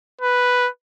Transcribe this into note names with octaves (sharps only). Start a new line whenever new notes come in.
B4